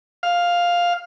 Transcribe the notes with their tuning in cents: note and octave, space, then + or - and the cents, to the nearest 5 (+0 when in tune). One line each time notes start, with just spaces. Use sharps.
F5 +5